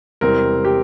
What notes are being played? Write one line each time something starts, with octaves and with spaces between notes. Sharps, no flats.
E1 E2 C3 G3 C4 A#4
G4